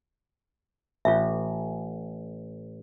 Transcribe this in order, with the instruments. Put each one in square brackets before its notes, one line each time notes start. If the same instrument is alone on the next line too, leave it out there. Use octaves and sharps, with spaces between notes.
[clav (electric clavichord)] A1 [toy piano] F4 E5